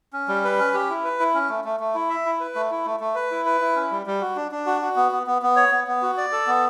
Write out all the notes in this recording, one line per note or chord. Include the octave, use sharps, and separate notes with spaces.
C#4
G3
B4
C#4
G4
E4
B4
E4
C#4
A3
A3
A3
E4
E5
E4
B4
A3
E4
A3
A3
B4
E4
B4
E4
C#4
G3
G3
F#4
D4
D4
F#4
F#4
B3
B3
B3
B3
C#5
B3
B3
F#4
D5
A4
B3